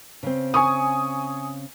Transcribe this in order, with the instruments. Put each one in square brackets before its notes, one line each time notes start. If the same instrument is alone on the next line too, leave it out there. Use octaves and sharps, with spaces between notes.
[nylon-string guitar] C#3 C4
[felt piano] G#5 C#6 D#6